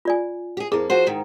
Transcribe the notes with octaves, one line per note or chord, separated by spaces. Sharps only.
F4 D5 G#5
G4 G#4
F2 A#3 E4 G#4
F3 F#4 C5
G#2 D#3